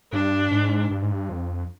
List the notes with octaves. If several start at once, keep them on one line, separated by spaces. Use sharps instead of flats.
G2 D4
G#2
G2
G#2
G2
F2